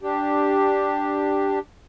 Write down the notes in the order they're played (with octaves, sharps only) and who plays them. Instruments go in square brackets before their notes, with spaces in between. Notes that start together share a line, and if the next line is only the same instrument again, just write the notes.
[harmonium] D4 G4